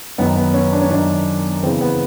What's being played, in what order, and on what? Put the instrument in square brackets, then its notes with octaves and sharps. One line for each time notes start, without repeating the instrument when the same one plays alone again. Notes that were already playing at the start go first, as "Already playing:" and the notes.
[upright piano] F#2 D#3 B3
B3
C#4
D4
C#4
F#2 D#3 D4
E2 C#3 E3 C4
B3